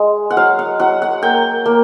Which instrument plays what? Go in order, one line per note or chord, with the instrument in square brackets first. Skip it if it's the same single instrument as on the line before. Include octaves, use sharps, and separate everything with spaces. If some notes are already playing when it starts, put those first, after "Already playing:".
Already playing: [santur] G#3
F#5
F#3 F5
F#5
F#3 F#5
F#5
A#3 G5
A#3